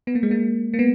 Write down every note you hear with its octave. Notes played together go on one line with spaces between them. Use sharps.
B3
A#3
G#3
A#3
A#3
B3